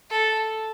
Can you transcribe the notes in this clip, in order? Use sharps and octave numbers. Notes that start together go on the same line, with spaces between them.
A4